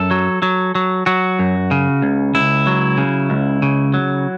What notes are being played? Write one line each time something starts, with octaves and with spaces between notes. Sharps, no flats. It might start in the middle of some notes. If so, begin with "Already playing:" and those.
Already playing: F#2 A4
F#3
F#3
F#3
F#3 F#4
F#2
C#3
C#2
C#2 E4
F#3
C#3
C#2
C#3
F#3